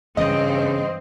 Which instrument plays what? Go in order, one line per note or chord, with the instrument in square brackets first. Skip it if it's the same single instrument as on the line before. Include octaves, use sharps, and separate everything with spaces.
[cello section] G2 C4 [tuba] C#3 [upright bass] E3 [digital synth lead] D#5